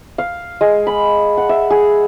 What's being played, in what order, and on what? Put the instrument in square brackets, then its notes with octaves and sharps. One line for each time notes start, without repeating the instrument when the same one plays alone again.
[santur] F5
G#3
B5
F#5
E5
G#4